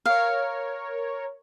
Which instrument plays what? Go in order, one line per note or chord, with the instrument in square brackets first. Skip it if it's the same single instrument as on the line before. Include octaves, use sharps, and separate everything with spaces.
[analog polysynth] A#4 C#5 [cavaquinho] F5